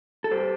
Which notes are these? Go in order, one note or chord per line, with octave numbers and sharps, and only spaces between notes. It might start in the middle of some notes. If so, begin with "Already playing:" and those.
A4
G2 G4 C5